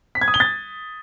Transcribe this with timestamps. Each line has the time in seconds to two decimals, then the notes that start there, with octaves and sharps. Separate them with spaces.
0.15 B6
0.21 G#6
0.28 D#6
0.34 G7
0.40 A6